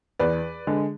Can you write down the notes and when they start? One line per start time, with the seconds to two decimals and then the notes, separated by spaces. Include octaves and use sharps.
0.19 E2 B4 D5
0.67 D3 G#3